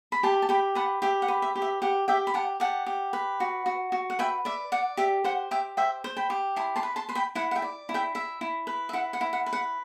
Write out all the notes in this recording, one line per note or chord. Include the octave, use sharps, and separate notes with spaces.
B5
G4 A5 C6
A5
G4 G5 B5
B4 F#5 A5
G4 E5 G5
F#5
B4
E5
G4
E5
G4 F#5
G4 E5 G5
B5
G4 F#5 A5
G4 F#5 A5
G4
B4
F#4
F#4
F#4
F#5
B4 E5 G5
D5 E5
D5 F#5
G4 E5
C5 F#5
G4 E5 G5
C5 E5 G5
C5
G5 B5
G4
E4 A5 C6
A5 C6
B4
A5 C6
B4 C6
G5 B5
E4 F#5
F#5
E5 G5
D5
E4
E5 G5
E4 E5
E4
B4
E5
E4 F#5
F#5
E4
F#5
B4
F#5